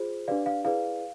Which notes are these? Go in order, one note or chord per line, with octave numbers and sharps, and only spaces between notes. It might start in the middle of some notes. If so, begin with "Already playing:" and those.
Already playing: F4 G#4 C5
D4 G4 B4 D5 F5
F5
E4 G#4 B4 D5 F5